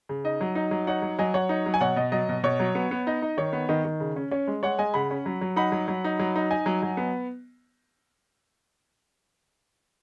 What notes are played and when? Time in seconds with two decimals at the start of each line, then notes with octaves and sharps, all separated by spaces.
0.09 C#3
0.24 D#4 D#5
0.41 F#3
0.55 D#4
0.71 F#3
0.87 D#4 C#5 F#5
1.02 F#3
1.19 F#3 D#5 G#5
1.34 F#3 C#5 F#5
1.49 D#4
1.66 F#3
1.74 G#5
1.81 B2 C#5 F#5
1.96 B2 D#5
2.12 F#3 D#5
2.29 B2
2.43 B2 C#5
2.60 F#3
2.75 B3
2.91 B3
3.07 D#4 D#5
3.22 D#4
3.37 D#3 C#5
3.53 B3
3.69 D#3 D#5
3.85 D#3
4.00 C#3
4.16 C#4
4.31 C#4 C#5
4.47 G#3
4.63 G#3 C#5 F#5
4.78 G#3 D#5 G#5
4.94 C#3 F#5 B5
5.11 C#4
5.26 F#3
5.41 F#3
5.56 D#4 F#5 B5
5.72 F#3
5.88 F#3
6.04 D#4
6.19 F#3
6.36 D#4
6.51 D#4 D#5 G#5
6.66 F#3
6.82 F#3
6.97 B3